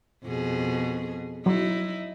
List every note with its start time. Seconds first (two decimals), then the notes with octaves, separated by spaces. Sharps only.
0.24 F2 B2 G#4
1.46 F#3 D#4 E4